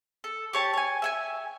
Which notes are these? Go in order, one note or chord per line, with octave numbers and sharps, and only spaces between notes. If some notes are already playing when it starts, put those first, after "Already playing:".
A4
G4 C#5 A5
C#5 G#5
E5 G5 G#5